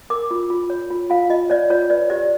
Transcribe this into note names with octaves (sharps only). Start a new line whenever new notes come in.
A#4 D6
F4
F4
C#5
F4
F4 F5
F4 D#5
C#5 D5
F4 C#5
B4 D5
G4 D5